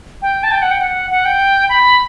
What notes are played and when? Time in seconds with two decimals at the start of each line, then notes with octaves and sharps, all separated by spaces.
0.22 G5
0.43 A5
0.51 G5
0.62 F#5
0.71 G5
0.81 F#5
1.11 F#5
1.25 G5
1.69 B5